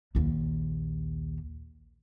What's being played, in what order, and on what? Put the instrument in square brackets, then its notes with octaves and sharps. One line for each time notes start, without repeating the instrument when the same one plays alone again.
[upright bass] A#1 D#2